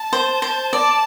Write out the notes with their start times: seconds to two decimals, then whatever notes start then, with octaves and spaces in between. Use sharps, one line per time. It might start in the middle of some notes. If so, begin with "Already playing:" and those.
Already playing: A5
0.13 C5
0.42 C5
0.73 D5 A5